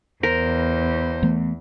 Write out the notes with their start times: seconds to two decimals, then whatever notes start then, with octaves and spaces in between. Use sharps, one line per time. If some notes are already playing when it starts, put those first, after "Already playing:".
0.23 E2 A#4 C5
1.22 E3 A3 B3